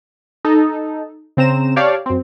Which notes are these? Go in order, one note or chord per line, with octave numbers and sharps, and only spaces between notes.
D#4 A4
C#3 C4 A#5 E7
G4 C#5 D5 F5 A5
F#2 C4